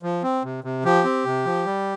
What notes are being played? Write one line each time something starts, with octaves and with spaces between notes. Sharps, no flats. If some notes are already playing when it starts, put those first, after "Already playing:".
F3
C4
C3
C3
F3 G4
C4
C3
F3
G3